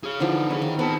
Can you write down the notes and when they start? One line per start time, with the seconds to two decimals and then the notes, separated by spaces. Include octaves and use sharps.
0.04 G#4 C#5
0.20 D3 E3 F3 D#4 D5
0.50 C#4 G#4 B4
0.62 D#3
0.79 B3 C4 B4 A5